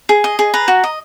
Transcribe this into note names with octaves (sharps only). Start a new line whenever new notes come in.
G#4
D#5
G#4
B4 A#5
F#4
D#5